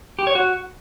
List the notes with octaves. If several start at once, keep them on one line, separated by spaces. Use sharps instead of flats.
G4
C#5
F#4